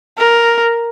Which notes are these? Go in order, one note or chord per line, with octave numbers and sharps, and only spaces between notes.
A#4